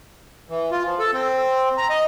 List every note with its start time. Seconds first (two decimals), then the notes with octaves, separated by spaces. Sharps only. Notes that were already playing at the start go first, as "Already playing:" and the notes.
0.49 E3
0.71 F4
0.86 F3
0.99 A4
1.13 C4
1.78 A#5
1.90 D#5